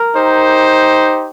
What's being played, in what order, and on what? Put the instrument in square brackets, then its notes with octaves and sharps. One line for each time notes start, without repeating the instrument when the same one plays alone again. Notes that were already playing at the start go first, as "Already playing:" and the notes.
Already playing: [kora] A#4
[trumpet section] D#4 G4 C5